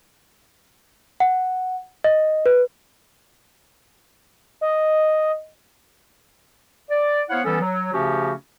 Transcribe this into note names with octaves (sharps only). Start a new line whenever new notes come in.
F#5
D#5
B4
D#5
D5
B3 E4 C5 C#5 F5 F#5
E3 G3 B3 C#4 A4
F#3
C#3 F3 A3 C#4 F#4 G4